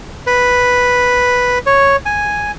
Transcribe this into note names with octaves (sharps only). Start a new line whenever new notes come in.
B4
C#5
G#5